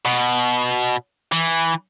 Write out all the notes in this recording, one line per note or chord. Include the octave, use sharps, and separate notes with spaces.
B2
E3